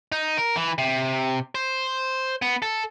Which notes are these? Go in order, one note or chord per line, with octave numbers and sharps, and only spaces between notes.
D#4
A#4
E3
C3
C5
B3
A4